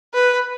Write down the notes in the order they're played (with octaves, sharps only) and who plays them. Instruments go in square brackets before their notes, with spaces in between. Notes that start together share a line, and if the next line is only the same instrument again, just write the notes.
[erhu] B4